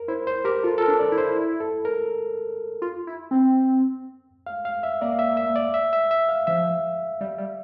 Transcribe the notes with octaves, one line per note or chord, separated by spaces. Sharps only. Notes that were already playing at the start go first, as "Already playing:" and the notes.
Already playing: A#4
E4 C5
C5
G4 A#4
F4 A4
A4
A#4
D4
D5
E4
C5
A4
A#4
F4
E4
C4
F5
F5
E5
A#3 D5
E5
E5
D5
E5
E5
E5
F5
F3 E5
G3
G3